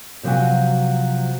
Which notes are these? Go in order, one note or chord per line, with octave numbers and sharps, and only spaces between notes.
C3 F3 F#3 F#4 G#5